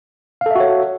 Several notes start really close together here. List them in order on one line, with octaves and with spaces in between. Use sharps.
F5 A4 E5 F#4 C#5